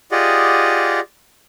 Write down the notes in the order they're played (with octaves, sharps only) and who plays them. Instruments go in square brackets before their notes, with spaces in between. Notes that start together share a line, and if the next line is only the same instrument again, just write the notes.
[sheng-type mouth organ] F4 G4 G#4 D5 D#5 F#5